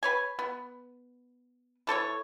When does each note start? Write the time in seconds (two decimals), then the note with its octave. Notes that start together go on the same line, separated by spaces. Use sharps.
0.03 B4 C#5 G#5
0.39 B3
1.87 E3 A4 C5 C#5